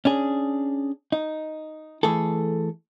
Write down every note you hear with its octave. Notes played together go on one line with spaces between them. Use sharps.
C#4 D4 G#4
D#4
E3 A3 G#4 A4